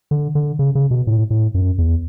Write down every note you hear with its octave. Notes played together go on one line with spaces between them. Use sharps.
D3
D3
C#3
C#3
B2
A2
A2
F#2
E2